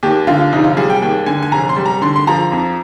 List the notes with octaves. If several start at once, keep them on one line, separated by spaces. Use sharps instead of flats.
D#2 G4
D3 F4
F1 D#4
F4
G3 G#4
G5
D#2 G5
D3 G#5
G#5
F1 A#5
C6
G3
A#5
D3 C6
C6
F3 A#5
F2